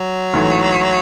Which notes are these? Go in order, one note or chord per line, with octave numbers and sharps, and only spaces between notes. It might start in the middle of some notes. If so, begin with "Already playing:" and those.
Already playing: F#3
A1 G#2 E3 A3